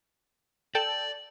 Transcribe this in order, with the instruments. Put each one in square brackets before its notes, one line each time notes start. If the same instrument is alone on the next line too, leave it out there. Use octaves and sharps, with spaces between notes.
[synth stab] A4 G5 A5 [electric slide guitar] D5